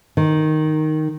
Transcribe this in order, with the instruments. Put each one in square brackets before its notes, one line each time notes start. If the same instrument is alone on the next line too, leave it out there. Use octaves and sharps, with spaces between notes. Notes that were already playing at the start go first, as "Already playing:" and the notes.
[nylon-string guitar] D#3